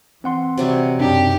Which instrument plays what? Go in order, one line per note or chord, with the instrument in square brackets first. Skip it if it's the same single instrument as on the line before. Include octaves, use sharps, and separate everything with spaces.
[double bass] E3 [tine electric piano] C4 F#5 C6
[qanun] C3 F#3 G3
[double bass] F#2 B2 [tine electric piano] C4 D4 D#4 [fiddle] G4